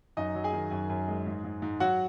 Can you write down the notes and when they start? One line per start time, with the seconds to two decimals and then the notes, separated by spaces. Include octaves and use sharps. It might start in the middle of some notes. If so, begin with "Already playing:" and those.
0.17 F#2 D#4 D#5
0.35 F#3
0.44 G#4 G#5
0.53 D#3
0.71 F#2
0.89 F#2
1.08 G#3
1.26 G#2
1.44 G#2
1.62 G#2
1.80 F#3 F#4 F#5